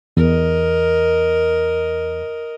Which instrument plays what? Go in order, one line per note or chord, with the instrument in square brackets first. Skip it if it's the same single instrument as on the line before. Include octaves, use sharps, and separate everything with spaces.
[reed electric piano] E2 [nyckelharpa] A#4 D#5